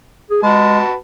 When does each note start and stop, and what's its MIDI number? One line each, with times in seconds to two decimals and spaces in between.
0.30 0.42 68
0.43 0.79 56
0.43 0.94 66
0.43 0.94 71
0.43 0.94 81